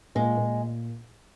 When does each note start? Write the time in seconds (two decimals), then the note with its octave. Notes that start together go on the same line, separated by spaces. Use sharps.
0.15 A#2 G#3
0.37 A#2